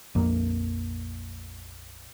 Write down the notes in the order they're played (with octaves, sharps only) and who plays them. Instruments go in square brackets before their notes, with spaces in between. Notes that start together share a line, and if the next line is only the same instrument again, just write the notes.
[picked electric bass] A#1 F2 A#3